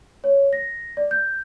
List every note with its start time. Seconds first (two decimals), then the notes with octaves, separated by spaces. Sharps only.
0.24 C#5
0.53 A#6
0.97 D5
1.11 G6